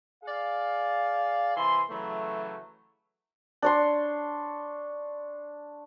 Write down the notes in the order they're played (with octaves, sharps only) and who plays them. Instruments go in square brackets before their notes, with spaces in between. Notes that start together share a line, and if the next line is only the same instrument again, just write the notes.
[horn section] G#4 D5 F5
C3 E3 G#5 C6
C#3 E3 F#3 A3
[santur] D4 C#5 C6